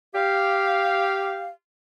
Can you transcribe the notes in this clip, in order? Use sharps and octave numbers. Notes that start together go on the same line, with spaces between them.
G4 F5